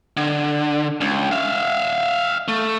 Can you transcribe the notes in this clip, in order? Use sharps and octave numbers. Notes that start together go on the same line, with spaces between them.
D3
C#2
E5 F5
A3